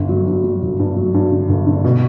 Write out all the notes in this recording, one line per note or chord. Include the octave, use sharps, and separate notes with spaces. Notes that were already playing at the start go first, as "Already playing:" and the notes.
Already playing: G1 D3
F#3
G2
F#3
G1
G2
F#3
G2
D3
G1
D3
B2